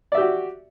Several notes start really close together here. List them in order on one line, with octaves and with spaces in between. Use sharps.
D5 E5 G4 F#4